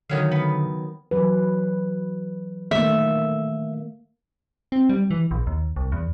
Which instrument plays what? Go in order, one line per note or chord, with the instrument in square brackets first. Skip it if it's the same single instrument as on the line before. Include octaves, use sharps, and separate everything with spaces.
[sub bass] D3 [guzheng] D#3 F#3 F5
[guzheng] B3
[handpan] E3 F#3 B4
[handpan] D#3 A3 A#3 [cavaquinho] E5
[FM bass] C4
G3
E3
A#1
D#2
C2
E2